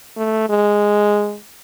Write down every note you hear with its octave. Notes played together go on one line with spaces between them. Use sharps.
A3
G#3